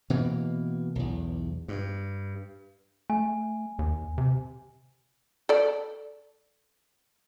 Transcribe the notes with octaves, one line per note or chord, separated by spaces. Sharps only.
B2 E3 A#3
B1 E2
G2
A3 G#5
D#2
C3
A4 D5